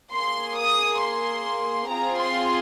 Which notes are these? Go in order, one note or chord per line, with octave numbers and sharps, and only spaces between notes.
A#3 G#4 C6
D#6
C6
C4 F4 G#4 A#5
C6